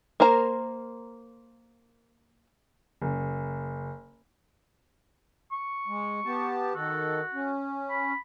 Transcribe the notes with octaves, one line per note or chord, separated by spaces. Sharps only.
A#3 A#4 C5 A#5
F#1
C#6
G#3
B3 G4 A5
D#3 F#4 A4
C#4
B5